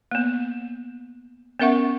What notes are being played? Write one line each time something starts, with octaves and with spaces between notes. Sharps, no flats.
A#3 B3
B3 C#4 A#4 E5 F#5 C#6